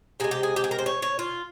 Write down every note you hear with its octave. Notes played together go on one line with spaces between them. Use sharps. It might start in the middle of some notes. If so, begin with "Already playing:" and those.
C3 E3 G#3 G#4
G4
G#4
G4
G#4
A#4
C5
C#5
C#5
F4